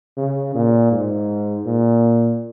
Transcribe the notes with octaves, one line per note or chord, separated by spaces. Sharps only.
C#3
A#2
G#2
A#2